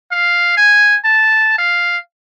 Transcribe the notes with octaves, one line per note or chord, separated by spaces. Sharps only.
F5
G#5
A5
F5